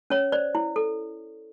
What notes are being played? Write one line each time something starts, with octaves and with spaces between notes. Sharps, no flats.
C#4 C#5
C5 D5
E4
A4